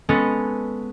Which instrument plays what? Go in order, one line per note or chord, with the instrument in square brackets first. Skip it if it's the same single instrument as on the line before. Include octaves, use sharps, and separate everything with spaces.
[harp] G#3 B3 C#4 A4 B4 C#5